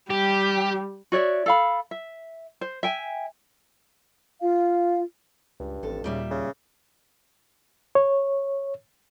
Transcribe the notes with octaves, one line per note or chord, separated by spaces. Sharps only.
G3 G4
F#4 C#5 D5 E5
A4 F5 B5
E5
C5
E5 G5 G#5
F4 F5
C#2 G2
A1 F2 A4
D#2 A#2 C#3 G3 E5
C#3
C#5